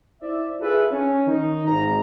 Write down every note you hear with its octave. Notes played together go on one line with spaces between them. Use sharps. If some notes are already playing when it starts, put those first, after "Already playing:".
E4 C5 D5 E5
F4 G#4 A4 B4 E5
C#4
D#3 D#4
G#1 A#5